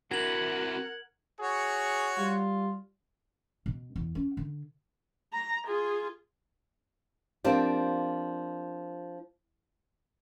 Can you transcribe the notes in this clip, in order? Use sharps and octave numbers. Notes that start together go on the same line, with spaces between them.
C3 E3 F#4 A#4 F#5 G#6 F#7
F#4 G#4 C#5
G3 F4
B2
E2
C#4
D3
A#5
F4 G#4
F3 A#3 C4 D4 G4